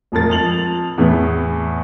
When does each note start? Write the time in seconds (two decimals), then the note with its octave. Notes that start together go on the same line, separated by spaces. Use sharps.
0.12 E1 F2 A2 A#4 A6
0.30 F2 F7 F#7
0.98 E2 A2 E3 B3